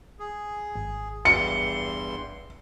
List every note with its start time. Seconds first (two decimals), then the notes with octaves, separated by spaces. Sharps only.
0.19 G#4
0.76 G#1
1.25 E2 G2 C6 C#7